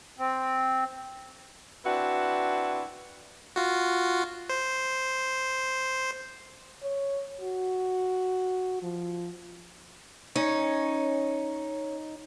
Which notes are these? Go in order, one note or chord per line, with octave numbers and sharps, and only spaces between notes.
C4
C4 D4 E4 F#4 B4
F4 F#4
C5
C#5
F#4
F3
C#4 D#4